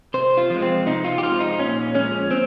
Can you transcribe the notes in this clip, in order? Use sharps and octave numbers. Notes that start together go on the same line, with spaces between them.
C3 C5
F4
F3 G#3
C4
C3 D#4
F4
G4
F3 G#3 F4
D#4
A#2 C#4
F3 G#3 C#4
A#2 C4